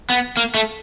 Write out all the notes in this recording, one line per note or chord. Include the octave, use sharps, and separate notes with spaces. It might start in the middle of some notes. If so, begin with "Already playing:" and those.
B3
A#3
A3